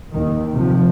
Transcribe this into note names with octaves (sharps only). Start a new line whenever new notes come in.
D#2 D#3
C3 F3